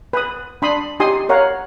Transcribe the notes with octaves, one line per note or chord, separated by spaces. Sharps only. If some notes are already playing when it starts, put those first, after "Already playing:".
B4 D#6
D4 B5 C6 D#6
D#4 G4 G#5 C6 D#6
A#4 C#5 F5 F#5